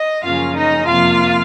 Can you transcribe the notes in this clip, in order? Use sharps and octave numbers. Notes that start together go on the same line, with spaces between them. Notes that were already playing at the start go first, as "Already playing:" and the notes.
Already playing: D#5
F#2 C#3 F3 A#3 C#4 F4 F5
D#4 D#5
F2 C3 F3 A#3 F4 F5